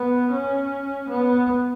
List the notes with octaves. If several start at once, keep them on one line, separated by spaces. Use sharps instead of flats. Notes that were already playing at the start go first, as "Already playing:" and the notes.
Already playing: B3
C#4
B3